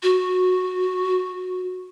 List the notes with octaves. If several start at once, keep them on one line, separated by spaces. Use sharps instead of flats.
F#4